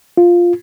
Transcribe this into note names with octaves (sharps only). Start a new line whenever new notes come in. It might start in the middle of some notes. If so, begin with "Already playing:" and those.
F4